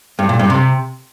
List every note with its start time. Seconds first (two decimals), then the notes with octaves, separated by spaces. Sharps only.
0.19 G2
0.29 A#2
0.39 G2
0.50 C3